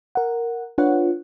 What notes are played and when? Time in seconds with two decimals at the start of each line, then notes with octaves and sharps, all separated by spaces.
0.15 A#4 F#5
0.78 D4 F4 B4 C#5 F#5